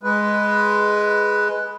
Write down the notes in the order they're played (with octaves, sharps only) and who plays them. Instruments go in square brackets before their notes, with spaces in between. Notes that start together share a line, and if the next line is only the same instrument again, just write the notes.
[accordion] G#3 B4